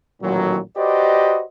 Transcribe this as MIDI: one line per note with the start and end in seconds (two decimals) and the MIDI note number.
0.22 0.59 33
0.22 0.59 46
0.22 0.59 51
0.22 0.59 54
0.77 1.42 66
0.77 1.42 67
0.77 1.42 71
0.77 1.42 72
0.77 1.42 74
0.77 1.42 75